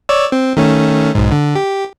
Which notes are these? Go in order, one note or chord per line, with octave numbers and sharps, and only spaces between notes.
C#5 D5 E6
C4
D#3 A3 C#4
B1 G#2
D3
G4